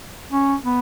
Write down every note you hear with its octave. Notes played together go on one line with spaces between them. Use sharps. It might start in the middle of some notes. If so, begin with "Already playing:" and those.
C#4
B3